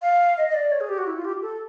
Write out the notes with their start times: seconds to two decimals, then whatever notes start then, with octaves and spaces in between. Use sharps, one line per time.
0.02 F5
0.38 D#5
0.48 D#5
0.54 D5
0.72 C#5
0.81 G#4
0.89 G4
0.98 F#4
1.07 E4
1.16 F4
1.25 G4
1.42 A4